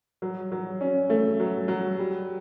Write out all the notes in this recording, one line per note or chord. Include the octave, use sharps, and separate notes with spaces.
F#3
F#3
C#4
A3
F#3
F#3
G3